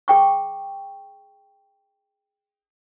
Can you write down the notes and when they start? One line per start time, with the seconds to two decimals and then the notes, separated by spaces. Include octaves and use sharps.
0.08 G#4 G5 C#6